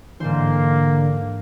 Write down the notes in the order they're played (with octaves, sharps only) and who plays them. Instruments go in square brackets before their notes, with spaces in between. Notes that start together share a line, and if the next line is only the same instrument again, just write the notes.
[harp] G#2 C5 [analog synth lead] D3 [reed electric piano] E3 [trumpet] A#3